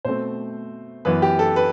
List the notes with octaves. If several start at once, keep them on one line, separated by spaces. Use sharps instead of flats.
B2 A3 C4 C5
F#2 E3 B3 B4
G4
A4
B4